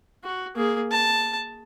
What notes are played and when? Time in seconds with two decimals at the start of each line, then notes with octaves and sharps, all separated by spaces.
0.24 F#4
0.56 A#3 G#4
0.91 A5